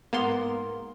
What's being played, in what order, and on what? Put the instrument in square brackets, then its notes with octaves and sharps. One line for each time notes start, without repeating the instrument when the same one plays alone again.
[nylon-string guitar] G#2 A#4 [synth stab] A#3 B3 C6